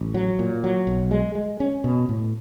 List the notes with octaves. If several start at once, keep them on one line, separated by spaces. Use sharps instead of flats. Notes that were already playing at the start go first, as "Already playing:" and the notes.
Already playing: A1
F#3
A#2
F#3
B1
G#3
G#3
C#4
B2
A2